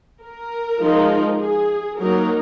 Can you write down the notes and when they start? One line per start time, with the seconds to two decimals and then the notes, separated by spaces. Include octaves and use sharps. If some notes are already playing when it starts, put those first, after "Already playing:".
0.22 A#4
0.80 F3 G#3 D#4
1.39 G#4
1.98 F#3 A#3 D#4 A#4